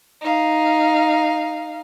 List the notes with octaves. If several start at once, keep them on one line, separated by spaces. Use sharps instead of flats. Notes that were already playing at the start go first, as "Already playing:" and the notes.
D#4 F5